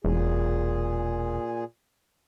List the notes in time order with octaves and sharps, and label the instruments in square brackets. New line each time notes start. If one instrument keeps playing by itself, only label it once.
[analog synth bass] E1 [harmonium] A#2 G#4